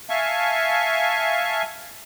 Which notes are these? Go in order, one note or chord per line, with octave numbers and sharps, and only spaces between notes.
E5 F5 G#5 A5 C#6